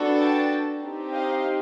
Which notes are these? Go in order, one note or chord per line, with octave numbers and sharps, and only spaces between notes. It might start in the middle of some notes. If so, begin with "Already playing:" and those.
Already playing: B3 D4 F#4 A4
G5 A5
C4 D#4 G4
D#5 F5